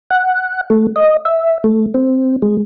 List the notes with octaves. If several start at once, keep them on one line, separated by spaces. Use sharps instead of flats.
F#5
A3
D#5
E5
A3
C4
G#3